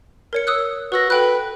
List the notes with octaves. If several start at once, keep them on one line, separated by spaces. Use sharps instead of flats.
A#4 C#5 C#7
D#6 E6 F#6
F#4 B4 E6 A#6
A4 B4 G5 F#6